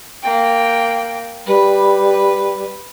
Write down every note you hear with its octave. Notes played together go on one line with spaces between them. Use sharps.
A#3 G5
G3 B4